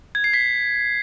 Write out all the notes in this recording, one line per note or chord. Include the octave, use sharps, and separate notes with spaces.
G#6
C7
B6